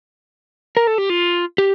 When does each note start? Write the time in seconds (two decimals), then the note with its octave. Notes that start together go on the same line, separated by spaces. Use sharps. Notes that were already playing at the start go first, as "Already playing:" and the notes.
0.77 A#4
0.87 A4
0.98 G4
1.10 F4
1.58 G4